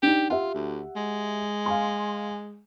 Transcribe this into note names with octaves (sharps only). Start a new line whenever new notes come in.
D4 D#4 G4
F4 G4 E5 F#5
D2
G#3
F5 G#5 C6